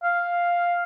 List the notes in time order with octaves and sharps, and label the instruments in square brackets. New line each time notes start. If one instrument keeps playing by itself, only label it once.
[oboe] F5